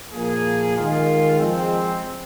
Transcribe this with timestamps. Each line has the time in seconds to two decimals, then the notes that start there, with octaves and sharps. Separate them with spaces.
0.14 A#2 F3 A#3 G#4
0.76 D#3 G#3 F4
1.38 F3 G#3 C4